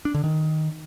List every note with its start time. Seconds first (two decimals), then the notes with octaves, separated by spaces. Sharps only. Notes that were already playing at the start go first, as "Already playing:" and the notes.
0.05 D4
0.14 D3
0.24 D#3